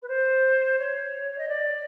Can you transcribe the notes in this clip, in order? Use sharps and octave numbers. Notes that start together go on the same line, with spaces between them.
B4
C5
C#5
D#5
D5